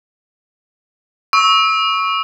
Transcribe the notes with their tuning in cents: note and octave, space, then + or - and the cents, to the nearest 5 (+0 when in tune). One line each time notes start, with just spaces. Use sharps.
C#6 +0 E6 -25